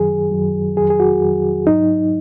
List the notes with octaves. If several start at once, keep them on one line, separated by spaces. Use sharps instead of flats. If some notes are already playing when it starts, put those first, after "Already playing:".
Already playing: F#2 D#3 F#3 G#4
F#2 D#3 F#3
F2 D#3 F#3 G#4
G#4
F#4
F2 D#3 F#3
G#2 F#3 D#4